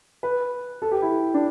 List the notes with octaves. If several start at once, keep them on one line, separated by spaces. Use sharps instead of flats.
B4
A4
G4
E4
D4